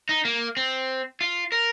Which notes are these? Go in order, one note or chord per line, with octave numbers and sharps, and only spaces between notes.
D#4
A#3
C4
F4
A#4